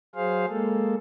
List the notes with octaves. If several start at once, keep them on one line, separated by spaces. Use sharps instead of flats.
F#3 G#4 C5 F5
G#3 A#3 A4